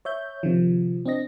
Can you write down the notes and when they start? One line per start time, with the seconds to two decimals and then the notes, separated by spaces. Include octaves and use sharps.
0.05 C#5 E5 G6
0.43 C3 D#3 F3
1.06 C4 D4 D#5 A#6